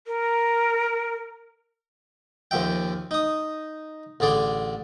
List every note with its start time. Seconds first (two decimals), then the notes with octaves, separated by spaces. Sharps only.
0.07 A#4
2.51 D#2 A#2 F3 E5 G5
3.11 D#4 D#6
4.20 A1 D3 G#4 D5 C6